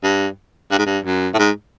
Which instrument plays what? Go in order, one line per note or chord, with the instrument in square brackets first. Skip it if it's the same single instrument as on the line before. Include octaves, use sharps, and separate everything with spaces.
[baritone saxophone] G2
G2
G#2
G2
F#2
A2
G#2